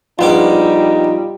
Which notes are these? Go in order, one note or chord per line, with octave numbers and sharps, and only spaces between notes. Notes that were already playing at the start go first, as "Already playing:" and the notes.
A#1 G3 B3 D#4 F4 D6